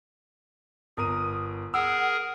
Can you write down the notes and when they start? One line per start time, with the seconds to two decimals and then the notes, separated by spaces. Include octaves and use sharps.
0.97 G1 A#4 D#6 D#7
1.74 G#4 A#4 F#5 E6